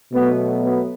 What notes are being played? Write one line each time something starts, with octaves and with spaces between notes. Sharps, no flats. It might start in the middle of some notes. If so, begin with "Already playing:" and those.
B2 F#3 A3 B3
B3